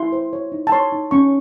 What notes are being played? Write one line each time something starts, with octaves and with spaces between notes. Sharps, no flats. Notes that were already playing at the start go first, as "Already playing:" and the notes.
Already playing: E4 C6
C5
C#5
D#4
A5
C#5 C6
D#4
C#4 C#6